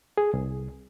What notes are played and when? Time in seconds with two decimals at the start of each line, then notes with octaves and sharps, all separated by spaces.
0.18 G#4
0.34 C2